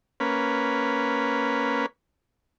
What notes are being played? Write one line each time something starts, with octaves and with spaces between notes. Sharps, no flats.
A#3 C#4 B4